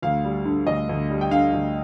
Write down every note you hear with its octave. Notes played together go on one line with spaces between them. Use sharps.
D2 F5
G3
D3
D2 D#5
D2
G3
G5
D3 F5
D2